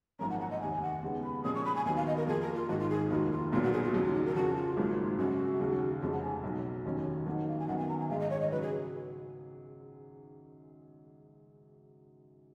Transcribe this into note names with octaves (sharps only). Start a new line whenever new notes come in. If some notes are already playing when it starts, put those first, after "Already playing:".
G#1 F#2 F3 A#3 C#4 A#5
F#5
F#5
D#5
F1 D#2 D#3 G#5
F#5
D#2 C#3 G#3 B3
B5
A#2 F3 G#3 C#4 D#6
C#6
B5
G#5
D#2 D#3 F#3 B3 G#5
F5
D#5
A#4
F2 F3 A#3 F4 G#4
A#4
F4
G#1 G#2 D#3 F#4
F4
G#4
F1 D#2 D#3 A#3 F4 F#4
F4
B1 A#2 F#3 B3 F4
F#4
G#4
F4
D#2 C#3 F#3 D#4
F4
D#4
A#4
F2 C#3 F3 F#4
F4
G#1 G#2 F#3 A#3
F#2 C#3 G#3 F#4
D#2 C#3 F#3
F1 F2 F3 G#3 C#4 G#4
F#5
G#5
B1 B2 F#3
F1 D#2 D#3 F#3 C#4
F2 D#3 F#3 A#3 D#4 F#5
F5
G#5
F#2 D#3 F#3 B3 F#5
G#5
A#5
G#5
A#1 G#2 D#3 G#3 F5
D#5
C#5
D#5
C#3 F#3 B4
G#4